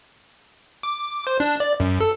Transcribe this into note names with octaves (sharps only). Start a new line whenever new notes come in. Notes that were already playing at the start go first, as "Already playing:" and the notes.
D6
C5
D4
D5
F#2
A4